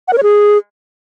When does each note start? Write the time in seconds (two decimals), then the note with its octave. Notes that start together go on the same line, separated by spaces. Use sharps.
0.08 F#5
0.13 A#4
0.18 C#5
0.23 G#4